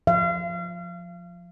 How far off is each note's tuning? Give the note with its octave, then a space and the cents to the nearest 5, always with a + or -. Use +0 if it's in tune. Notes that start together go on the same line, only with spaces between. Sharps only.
F3 +15 F5 -35